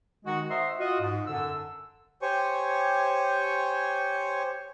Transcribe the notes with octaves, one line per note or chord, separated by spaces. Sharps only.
D#3 G#3 D#4 F#4
C5 D#5 E5 F#5 A#5 C6
F4 F#4 D#5
G#2
F#2 D3 E6
G4 C5 C#5 G#5 C#6